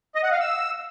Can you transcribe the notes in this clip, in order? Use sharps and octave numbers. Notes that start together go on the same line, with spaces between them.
D#5
F#5
F5
E6